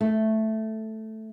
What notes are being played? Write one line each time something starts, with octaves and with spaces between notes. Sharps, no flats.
A3